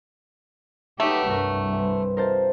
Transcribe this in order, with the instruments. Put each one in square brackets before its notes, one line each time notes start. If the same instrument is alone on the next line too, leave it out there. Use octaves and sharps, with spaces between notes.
[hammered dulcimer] F#3 B4 [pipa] A3 [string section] D#4 G4 E5
[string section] C2 G2 [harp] A#4
[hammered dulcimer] E3 C5
[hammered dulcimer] C3 D#4 F4 [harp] A#4 C5 A5